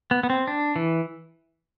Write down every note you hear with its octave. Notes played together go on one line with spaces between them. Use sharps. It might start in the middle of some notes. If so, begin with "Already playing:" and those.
B3
B3
C4
D4
E3